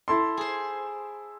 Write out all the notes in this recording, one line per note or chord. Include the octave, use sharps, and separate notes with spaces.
E4 A4 C6
G#4 C5